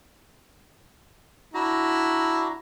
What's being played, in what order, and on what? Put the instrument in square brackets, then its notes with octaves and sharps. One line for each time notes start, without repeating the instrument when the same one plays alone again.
[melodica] D4 F#4 A#5 [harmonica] E4